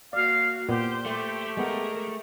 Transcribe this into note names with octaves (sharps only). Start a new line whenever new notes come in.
A#3 F#4 D5 F5
A#2 B3 G4 C5
A3 G4
G#3 B3 G#4 A#4